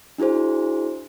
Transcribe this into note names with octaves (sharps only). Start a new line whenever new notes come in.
D4 E4 F#4 G#4 C5